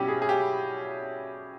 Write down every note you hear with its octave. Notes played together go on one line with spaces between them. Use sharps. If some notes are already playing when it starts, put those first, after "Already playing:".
Already playing: B2 G3 C#4 E4 G4
G#4
G#4
G4